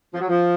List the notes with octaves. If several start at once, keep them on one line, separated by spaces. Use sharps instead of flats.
F3
F#3
F3